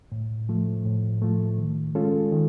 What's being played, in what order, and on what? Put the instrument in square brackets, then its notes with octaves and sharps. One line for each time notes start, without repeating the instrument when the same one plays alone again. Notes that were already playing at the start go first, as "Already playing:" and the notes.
[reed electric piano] A2
F3 A3
A2
F3 A3
D#3
G#3 C#4 F4 A4
D#3